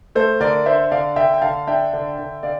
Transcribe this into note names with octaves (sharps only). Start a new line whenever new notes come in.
A3 A4 C5
D3 A#4 D5
D4 C5 E5
D3 D5 F5
D3 E5 G5
G5
D3 F5 A5
D4 E5 G5
D3
D3
D3 D5 F5